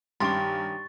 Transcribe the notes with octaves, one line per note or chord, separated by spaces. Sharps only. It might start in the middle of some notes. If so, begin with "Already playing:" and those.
G2 D#3 C#4 G4 C6 C#6 A6